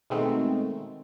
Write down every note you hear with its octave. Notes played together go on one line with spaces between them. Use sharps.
B2 D#3 G#3 A3 C4